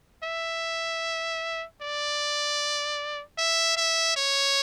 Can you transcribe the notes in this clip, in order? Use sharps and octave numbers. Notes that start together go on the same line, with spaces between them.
E5
D5
E5
E5
C#5